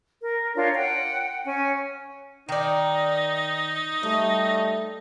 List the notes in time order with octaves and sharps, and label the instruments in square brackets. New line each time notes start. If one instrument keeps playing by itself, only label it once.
[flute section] A#4
D4 F4 A#4 C#5
F#5 G5
C#4 G#5
[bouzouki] D#3 D5 [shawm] D#4
[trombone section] G3 A3 [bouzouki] D#5